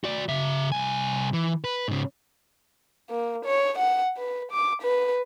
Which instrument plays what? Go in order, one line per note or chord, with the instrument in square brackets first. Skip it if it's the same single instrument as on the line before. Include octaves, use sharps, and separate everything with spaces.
[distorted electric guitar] F#4 D5
C#3 E5
C2 G#5
E3
B4
G#2 C#3
[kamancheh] A#3
C#5
F#5
B4
D6
B4